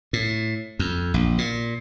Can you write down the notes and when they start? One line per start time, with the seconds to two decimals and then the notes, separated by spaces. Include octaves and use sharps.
0.13 A2
0.79 F2
1.14 A#1
1.38 A#2